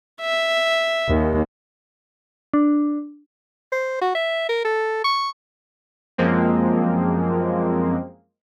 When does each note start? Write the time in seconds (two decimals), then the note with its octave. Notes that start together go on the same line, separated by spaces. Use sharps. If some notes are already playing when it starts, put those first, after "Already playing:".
0.21 E5
1.08 D#2
2.54 D4
3.72 C5
4.01 F#4
4.15 E5
4.49 A#4
4.65 A4
5.04 C#6
6.18 F#2 F3 G#3 A#3 C4